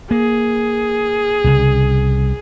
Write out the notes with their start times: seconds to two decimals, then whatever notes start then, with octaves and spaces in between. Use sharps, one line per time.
0.11 A#3 G#4
1.44 C2 C#3